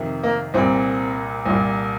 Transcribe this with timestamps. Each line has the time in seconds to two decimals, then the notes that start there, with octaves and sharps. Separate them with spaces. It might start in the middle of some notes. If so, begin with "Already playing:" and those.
Already playing: F2 C3 D#3
0.23 A#3
0.54 C2 A#2 C4
1.46 C2 A#2